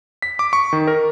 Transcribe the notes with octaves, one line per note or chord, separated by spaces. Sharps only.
B6
D6
C#6
D#3
A#4